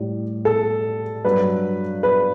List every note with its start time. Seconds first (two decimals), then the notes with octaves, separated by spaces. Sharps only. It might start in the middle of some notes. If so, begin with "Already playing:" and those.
Already playing: A2 G3
0.45 A4
1.25 G2 F#3 B4
2.03 B4